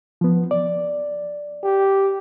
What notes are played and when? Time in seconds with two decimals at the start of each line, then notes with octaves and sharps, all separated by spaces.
0.21 F3 B3
0.51 D5
1.63 G4